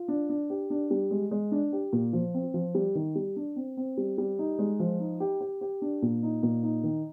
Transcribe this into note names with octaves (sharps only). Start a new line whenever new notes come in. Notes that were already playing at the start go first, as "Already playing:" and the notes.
Already playing: F4
D4
D4
G4
D4
G3
G#3
G#3
D4
G4
A#2
F3
C4
F3
G3
D#3
G3
D4
C4
C4
G3
G3
D#4
G#3
F3
D#4
G4
G4
G4
D4
A#2
D#4
A#2
D#4
D#3